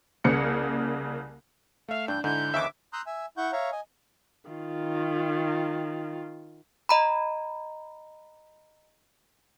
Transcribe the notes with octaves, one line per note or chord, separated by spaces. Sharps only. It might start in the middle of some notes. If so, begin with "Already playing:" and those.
C2 C#3 A#3 C#7
A3 E5 F5
G2 E3 D4 G6
G#2 D3 D4 E4 G6
D#2 C#3 E3 E5 D6
A#5 C6 D#6 E6 F#6 G6
E5 G#5 E6
E4 F#5 C#6 G6
C#5 E5 F5 A#5 C#6
D#5 G#5
D#3 F4
D#5 A#5 B5